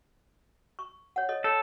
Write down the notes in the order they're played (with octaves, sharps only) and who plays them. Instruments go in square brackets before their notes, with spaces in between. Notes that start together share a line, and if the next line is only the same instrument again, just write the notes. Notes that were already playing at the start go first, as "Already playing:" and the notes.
[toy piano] C#6
C#5 F#5
A4 C#5 D#5
[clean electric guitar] A4 [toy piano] C#5